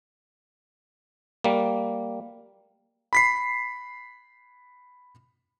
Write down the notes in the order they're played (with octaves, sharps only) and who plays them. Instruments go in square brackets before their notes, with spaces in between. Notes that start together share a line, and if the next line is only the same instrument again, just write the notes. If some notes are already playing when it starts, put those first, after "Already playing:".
[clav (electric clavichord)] G3 A#3
[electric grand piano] B5 B6 C7